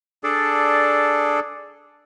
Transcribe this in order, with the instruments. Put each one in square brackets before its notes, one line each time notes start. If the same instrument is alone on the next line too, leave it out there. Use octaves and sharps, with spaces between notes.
[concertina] D4 G#4 A4 D5